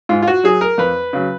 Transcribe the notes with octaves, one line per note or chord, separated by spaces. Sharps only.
G#2 F4
F4
F#4
F#3 G#4
A#4
F2 B4
C#3 F#3